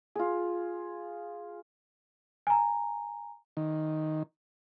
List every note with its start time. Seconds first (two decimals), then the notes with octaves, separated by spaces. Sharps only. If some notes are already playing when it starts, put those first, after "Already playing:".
0.15 F4 G#4
2.47 G#5 A#5
3.57 D#3